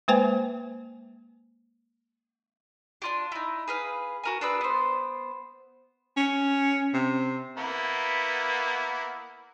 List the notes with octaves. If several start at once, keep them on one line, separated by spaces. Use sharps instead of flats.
G#3 A#3 B4 C5 G5 G#5
D4 F4 G4
D#4 E4
G#4 B4 F5
F#4 A#4 G#5
D4 G#4 B4 E6
B3 C5
C#4
C3
A#3 B3 E4